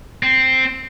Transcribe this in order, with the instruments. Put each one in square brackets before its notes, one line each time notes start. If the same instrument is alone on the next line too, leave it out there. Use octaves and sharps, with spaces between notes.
[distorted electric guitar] C4